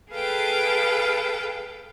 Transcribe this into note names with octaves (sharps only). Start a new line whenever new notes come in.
G#4 A4 B4 F5 G5 A5